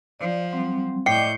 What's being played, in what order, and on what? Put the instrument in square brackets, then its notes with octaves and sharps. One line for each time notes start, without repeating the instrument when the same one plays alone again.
[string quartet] F3 [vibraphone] D5
[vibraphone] F#3 G3 C4
[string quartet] A2 G6 [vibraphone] D5 D#5 D6 [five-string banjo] G5 [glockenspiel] C7 C#7